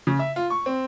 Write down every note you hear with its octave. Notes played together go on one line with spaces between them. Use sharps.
C#3
E5
F4
C#6
C4